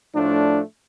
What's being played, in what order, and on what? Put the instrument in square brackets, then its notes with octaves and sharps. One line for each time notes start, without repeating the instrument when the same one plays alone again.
[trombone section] A2 F3 A3 D4